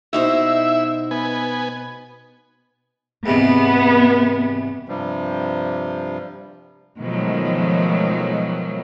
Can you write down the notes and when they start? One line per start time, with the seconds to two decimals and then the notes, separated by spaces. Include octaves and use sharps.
0.13 B2 D#4 E4 C5 E5
1.11 B3 G#5
3.26 E2 G#2 C3 B3
4.88 G2 C3 F3 G3
6.98 B2 D#3 F3 F#3 G#3 A3